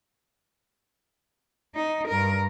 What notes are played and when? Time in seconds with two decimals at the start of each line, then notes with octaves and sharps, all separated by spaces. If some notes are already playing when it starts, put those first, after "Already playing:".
1.75 D#4
2.08 G2 A#4